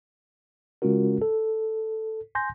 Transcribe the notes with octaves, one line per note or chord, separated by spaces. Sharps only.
C#3 G#3 C#4 F4 F#4 A#4
A4
G#5 C6 G6 A#6